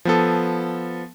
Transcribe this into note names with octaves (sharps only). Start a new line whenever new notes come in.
F3 B3 A4